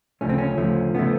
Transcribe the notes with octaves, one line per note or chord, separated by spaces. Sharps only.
D2 C#3 F3 A3 C#4
C4
C#4
D2 C#3 F3 A3
C#3 F3 A3 B3